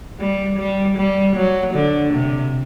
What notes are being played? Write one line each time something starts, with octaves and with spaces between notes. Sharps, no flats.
G3
G3
G3
F#3
D3
C3